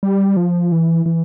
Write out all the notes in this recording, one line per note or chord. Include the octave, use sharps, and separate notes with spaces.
G3
F3
E3
E3